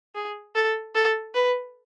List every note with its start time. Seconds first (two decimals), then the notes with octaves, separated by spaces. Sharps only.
0.15 G#4
0.55 A4
0.95 A4
1.35 B4